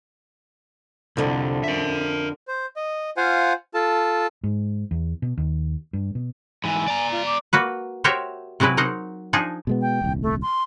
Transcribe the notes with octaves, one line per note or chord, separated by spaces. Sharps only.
C2 F2 D3
A#4 E5
C5
D#5
F4 C5 F5 F#5 G#5
F4 A4 A5
G#2
E2
B2
D#2
G2
B2
G#2 E3 G#5
D5 A#5
F4
D6
A#3 F#4 B4
F#4 G4 A#4 C5 C#5 E5
C3 F#3 G#3 E4 B4
F#3 D#4 A#4 C5 F#5
F3 D4 D#4 G#4
B2 G#3 B3
G5
D#1 C2
A3
C6